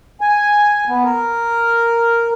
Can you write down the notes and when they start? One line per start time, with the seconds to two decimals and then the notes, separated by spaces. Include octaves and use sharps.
0.21 G#5
0.88 B3
1.04 A#4